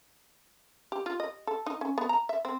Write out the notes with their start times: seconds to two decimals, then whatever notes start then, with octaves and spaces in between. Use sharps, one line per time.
0.92 G4
1.06 F4
1.20 D#5
1.47 A4
1.66 D#4
1.81 C#4
1.98 B3
2.09 A#5
2.29 E5
2.45 C4